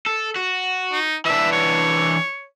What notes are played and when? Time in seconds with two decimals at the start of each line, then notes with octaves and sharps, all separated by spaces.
0.06 A4
0.36 F#4
0.92 D#4
1.25 E3 D4 E5
1.52 C#5